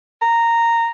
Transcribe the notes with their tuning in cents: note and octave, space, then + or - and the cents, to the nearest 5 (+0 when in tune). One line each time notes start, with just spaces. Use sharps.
A#5 -10